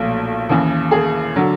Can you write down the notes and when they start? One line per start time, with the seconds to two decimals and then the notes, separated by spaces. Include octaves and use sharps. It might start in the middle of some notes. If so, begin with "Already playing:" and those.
Already playing: B1 A#2 F3 A3
0.50 D#2 C#3 E3
0.91 G#4
1.36 D3 F#3